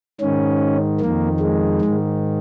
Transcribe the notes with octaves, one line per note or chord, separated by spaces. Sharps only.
G#2 D#3 C#4
F2 D#3 A#3
G#3
G#2 D#3